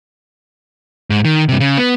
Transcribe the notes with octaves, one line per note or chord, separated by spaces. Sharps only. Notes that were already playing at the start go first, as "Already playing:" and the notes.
G#2
D#3
G2 C3
C#3
B3